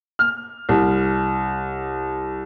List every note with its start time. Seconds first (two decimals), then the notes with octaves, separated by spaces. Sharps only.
0.19 F6
0.69 C2